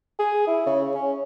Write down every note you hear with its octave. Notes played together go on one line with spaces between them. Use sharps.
G#4
E4
C#3
C#4